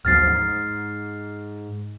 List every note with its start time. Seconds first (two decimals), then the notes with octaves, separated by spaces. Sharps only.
0.05 A1 D2 F3 F6 A6 C7
0.27 G#2